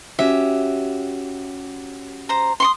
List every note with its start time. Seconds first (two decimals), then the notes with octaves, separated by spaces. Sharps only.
0.19 C#4 F#4 G4 E5
2.29 C5 A#5
2.60 C6 C#6 D#6